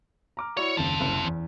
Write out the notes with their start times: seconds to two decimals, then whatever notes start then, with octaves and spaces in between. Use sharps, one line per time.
0.37 A#5 D6 F6
0.57 E4 F#4 C#5 D5
0.77 F#1 D#2 C4 A5
1.00 F#1 C2
1.25 E2